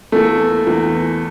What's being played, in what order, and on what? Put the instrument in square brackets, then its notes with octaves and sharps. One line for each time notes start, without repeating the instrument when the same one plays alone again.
[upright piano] E2 E3 A#3 [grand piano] A3
[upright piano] E2 E3 A#3